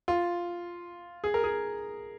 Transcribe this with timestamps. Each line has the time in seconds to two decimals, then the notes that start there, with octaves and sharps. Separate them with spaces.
0.08 F4
1.24 G#4
1.34 A#4
1.44 G#4